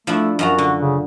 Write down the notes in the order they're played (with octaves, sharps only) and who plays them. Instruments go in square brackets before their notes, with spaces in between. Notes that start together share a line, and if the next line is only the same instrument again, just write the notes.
[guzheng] F3 D4 E4 [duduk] A3
[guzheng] F#2 F3 A#5 [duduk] F#4
[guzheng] D3
[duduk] C#3